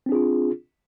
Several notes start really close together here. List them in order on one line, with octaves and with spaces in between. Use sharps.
C4 D4 G#4 F4